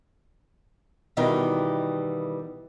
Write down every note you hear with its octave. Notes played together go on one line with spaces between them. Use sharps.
B2 D#3 E3 G3 D#5